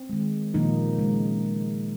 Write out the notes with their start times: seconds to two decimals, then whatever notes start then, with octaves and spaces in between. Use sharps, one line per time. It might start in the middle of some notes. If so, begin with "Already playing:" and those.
Already playing: C4
0.09 D#3 G#3
0.54 A#2 D#3 F3 A#3 D#4
0.98 C#3 G#3